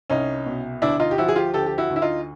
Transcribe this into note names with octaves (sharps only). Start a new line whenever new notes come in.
C2 C#4 D#4
B2
D2 D4 E4
D#4 F4
G4
F3 E4 F#4
G#4
F4 G4
D2 G4 A4
G4
E4 F#4
D2
E4
D#4 F4